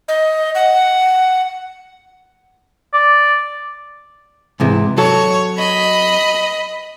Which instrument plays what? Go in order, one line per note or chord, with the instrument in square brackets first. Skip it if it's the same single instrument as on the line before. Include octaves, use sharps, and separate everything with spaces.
[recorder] D#5
F#5
[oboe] D5
[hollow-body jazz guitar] G#2 C3 E3
[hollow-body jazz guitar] F#3 A4 [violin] C#5
[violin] D#5 B5